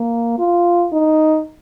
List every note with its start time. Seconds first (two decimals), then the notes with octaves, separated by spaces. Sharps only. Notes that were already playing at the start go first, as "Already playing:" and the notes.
Already playing: A#3
0.39 F4
0.93 D#4